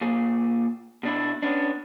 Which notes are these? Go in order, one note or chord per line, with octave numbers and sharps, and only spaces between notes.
A#2 G#4
B2 D4 E4
B3 C#4 D4